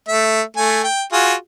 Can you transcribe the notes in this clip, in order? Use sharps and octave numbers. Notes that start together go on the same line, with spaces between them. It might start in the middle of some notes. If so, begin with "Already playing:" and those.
A3 E5
A3 G#5
G5
F4 F#4 G#4